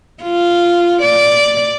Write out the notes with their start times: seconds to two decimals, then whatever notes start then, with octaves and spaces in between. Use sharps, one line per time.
0.23 F4
1.02 D5